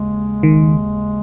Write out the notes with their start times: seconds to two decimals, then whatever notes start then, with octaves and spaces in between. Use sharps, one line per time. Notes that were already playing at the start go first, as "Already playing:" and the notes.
Already playing: D#2 C#3 G#3
0.43 D#3